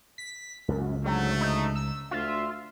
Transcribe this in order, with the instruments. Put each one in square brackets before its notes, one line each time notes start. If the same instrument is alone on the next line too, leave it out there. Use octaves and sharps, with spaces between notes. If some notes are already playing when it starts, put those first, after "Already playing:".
[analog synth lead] B6
[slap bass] C#2 [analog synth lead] F#2
[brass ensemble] D2 G#2 A3 [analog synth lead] F#3
[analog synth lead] D#4
E6
[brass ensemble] D2 E5 [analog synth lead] F4